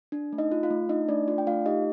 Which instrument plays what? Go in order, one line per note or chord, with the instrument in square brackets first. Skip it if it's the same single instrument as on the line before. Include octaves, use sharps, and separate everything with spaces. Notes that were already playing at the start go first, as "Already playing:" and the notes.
[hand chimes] D4
A3
D#4 D#5
F4
F4 F5
A3
D4 D#4 D#5
A3 D4 D5
D4 F4 D5
G5
A3 F4 F5
D#4 G4 D#5